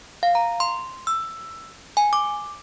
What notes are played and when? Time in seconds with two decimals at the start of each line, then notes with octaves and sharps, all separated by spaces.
0.23 F5
0.35 A#5
0.60 C6
1.07 E6
1.97 G#5
2.13 D6